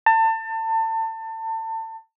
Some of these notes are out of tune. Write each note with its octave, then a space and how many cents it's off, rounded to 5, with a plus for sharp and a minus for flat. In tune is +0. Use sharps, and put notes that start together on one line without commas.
A5 +30